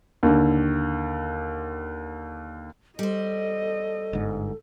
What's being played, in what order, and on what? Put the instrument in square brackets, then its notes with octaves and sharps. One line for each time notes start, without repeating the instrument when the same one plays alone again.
[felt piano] D#2 D3
[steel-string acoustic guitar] G3 C5 [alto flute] A4 [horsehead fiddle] D#5
[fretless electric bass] G1 G#2